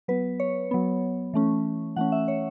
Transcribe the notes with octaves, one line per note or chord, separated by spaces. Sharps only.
F#3 B3 B4
C#5
F#3 B3
E3 A3 C#4
E3 A3 C#4 F#5
E5
C#5